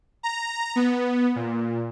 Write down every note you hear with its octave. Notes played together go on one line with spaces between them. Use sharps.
A#5
B3
A#2